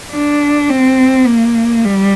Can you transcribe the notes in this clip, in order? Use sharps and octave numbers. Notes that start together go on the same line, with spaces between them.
D4
C4
A#3
G3